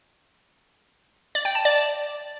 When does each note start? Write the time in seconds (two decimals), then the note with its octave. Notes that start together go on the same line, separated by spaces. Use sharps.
1.35 D5
1.45 G5
1.55 A5
1.65 D5